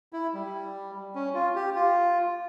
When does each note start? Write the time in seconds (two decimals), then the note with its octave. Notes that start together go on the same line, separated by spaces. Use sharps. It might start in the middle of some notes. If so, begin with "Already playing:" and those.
0.13 E4
0.34 G3
1.15 C#4
1.35 F4
1.56 G4
1.75 F4